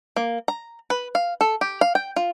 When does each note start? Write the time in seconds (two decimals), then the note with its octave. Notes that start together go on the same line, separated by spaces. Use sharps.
0.16 A#3
0.48 A#5
0.90 B4
1.15 F5
1.41 A4
1.61 G4
1.81 F5
1.95 G5
2.16 F4